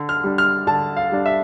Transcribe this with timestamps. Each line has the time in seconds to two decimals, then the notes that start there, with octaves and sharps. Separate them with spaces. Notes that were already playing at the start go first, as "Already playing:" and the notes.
Already playing: D3
0.09 F6
0.24 G3 D4
0.38 F6
0.67 D3 A5
0.97 F5
1.11 G3 D4
1.26 E5